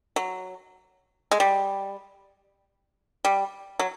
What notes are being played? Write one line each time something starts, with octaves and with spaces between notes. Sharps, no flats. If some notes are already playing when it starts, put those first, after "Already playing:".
F#3
G#3
G3
G3
F#3